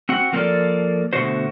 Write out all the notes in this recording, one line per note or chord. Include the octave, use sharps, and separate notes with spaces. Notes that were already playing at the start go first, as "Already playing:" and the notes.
C4 F#4 F#5
F3 A#3 C4 F#4 A4 D5
B2 D3 A3 A#3 F#4 C5